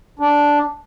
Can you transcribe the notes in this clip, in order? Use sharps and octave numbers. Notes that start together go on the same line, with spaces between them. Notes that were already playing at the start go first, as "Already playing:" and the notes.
D4